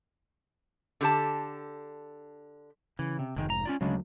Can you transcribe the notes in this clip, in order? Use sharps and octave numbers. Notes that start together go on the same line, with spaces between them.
D3 G4 A5
C#3 E3
C3
F1 G#2 D3 D#3 G#3
A#5
C#4 F4 D5
D2 C#3 F#3 G#3 D4